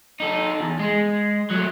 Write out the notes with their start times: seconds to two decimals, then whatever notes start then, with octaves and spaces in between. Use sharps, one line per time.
0.20 D#4 A4
0.61 E2
0.79 G#3
1.51 F#3 A3